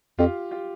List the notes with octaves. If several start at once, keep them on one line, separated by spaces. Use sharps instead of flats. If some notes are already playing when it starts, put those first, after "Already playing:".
F2 F4 G4
F4 G4